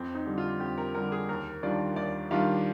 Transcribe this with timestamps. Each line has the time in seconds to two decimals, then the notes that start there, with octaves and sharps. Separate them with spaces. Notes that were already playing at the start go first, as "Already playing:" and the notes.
Already playing: F2 C4
0.15 D#4
0.26 D3 G3
0.38 F4
0.60 F2 G4
0.78 A#4
0.95 D3 G3 A#4
1.12 G#4
1.29 D#2 A#4
1.63 D#3 G3 D4 F4 D5
1.96 D#2 D5
2.31 D#3 G3 D4 F4 F5